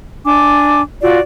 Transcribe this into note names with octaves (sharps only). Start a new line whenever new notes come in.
D4 G#5 D6
F4 F#4 D5